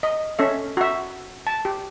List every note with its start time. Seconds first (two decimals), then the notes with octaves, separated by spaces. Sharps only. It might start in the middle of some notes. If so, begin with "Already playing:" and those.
0.03 D#5
0.39 C#4 A4 E5
0.77 F#4 E5
1.47 A5
1.65 G4